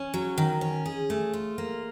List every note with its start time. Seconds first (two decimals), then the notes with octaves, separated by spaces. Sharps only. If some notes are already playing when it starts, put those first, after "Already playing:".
Already playing: C#4
0.14 F#3
0.38 D#3
0.61 C#4
0.86 G#4
1.10 A3
1.33 F4
1.58 A#3